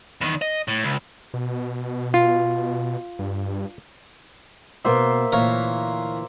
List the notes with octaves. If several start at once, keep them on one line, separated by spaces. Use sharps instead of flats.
E2 D#3
D#5
A2
C#2
B2
F4
G2
B2 A#3 B3 F#4 C5 E5
D2 A#2 E3 A#4 C#5 F5